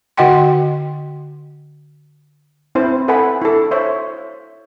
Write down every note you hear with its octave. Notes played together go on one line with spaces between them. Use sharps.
D3 F#4 D#5 F#5 G5 C6
C4 E4 B4 C5
A4 B4 E5 F#5 G#5 B5
E4 A4
C5 C#5 E5